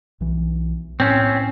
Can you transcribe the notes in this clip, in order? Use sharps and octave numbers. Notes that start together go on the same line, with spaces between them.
B1 E3
A2 C4 C#4